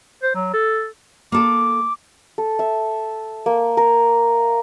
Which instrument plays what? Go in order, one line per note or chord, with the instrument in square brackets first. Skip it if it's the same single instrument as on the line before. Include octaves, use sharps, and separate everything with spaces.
[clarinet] C5
F#3
A4
[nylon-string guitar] A#3 A4 [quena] D6
[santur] A4
E5
A#3
A#4